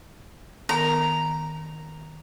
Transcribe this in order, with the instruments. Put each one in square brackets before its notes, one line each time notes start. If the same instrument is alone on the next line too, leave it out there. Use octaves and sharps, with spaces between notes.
[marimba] D#3 B3 A#4 [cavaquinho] A#5